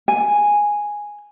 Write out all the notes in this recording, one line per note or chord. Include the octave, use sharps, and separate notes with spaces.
G#5